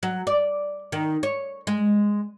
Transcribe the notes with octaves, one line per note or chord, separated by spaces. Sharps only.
F#3
D5
D#3
C#5
G#3